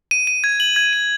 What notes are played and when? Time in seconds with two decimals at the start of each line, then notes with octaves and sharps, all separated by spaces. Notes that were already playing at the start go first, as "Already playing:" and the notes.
0.11 D#7
0.27 D#7
0.44 G#6
0.60 F#7
0.76 G#6
0.93 D#7